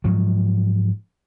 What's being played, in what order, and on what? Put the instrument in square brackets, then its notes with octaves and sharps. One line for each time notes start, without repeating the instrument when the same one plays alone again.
[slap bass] G#2 F3 F#3